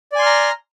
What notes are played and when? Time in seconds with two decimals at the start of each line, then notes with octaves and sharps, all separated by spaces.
0.12 D5
0.16 G#5
0.19 C6
0.22 F6
0.26 A#5